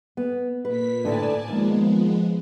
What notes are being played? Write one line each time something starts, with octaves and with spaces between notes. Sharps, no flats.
B3
A#2 B4 B6
D2 A2 D3 D5 G#5 A5
D#2 F3 G#3 B3